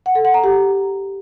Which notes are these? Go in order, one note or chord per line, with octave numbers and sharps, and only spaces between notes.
F#5
A4
F#5
A#5
G4